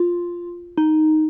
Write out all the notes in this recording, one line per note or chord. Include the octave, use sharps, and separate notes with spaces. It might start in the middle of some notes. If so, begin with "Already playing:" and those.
Already playing: F4
D#4